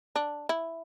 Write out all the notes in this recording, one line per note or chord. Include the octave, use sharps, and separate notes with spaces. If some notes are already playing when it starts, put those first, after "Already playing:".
D4
E4